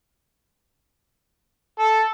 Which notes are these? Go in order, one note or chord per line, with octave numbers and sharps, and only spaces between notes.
A4